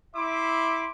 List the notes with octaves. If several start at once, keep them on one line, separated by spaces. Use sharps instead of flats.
E4 E5 C6 D6